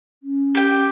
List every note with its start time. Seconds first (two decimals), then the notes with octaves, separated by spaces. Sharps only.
0.23 C#4
0.55 G4 G5